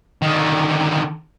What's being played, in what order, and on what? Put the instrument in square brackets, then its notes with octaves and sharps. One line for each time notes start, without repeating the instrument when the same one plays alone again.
[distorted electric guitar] D3 D#3